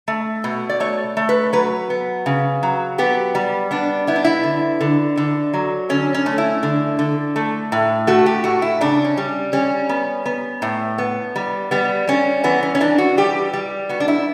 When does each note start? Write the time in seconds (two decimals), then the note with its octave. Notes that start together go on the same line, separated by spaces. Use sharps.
0.08 A3
0.44 B2
0.69 D5
0.80 A3 C#5
1.17 A3
1.29 B4
1.53 F#3 B4
1.90 B3
2.26 C#3
2.63 F#3
2.98 B3 G4
3.35 G3
3.71 B3 D4
4.07 B3 E4
4.16 D4
4.25 E4
4.44 D3
4.81 D3
5.17 D3
5.54 F#3
5.89 D3 C#4
6.14 C#4
6.26 A3
6.38 E4
6.63 D3
6.99 D3
7.36 A3
7.72 A2
8.07 A3 F#4
8.26 G4
8.44 A2 F#4
8.62 E4
8.81 C#3 D4
9.05 C#4
9.17 G3
9.53 G3 C#4
9.89 B3
10.26 B3
10.62 A2
10.98 B3
11.36 G3
11.71 G3 B3
12.08 G3 C#4
12.44 E3 B3
12.63 C#4
12.75 C#4
12.81 E3 D4
12.98 F#4
13.17 G3 G4
13.53 G3
13.89 B3 F#4
14.00 D4
14.08 E4